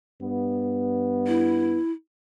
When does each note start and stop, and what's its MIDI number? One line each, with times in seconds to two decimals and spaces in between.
0.21 1.77 43
0.21 1.77 59
1.27 1.91 64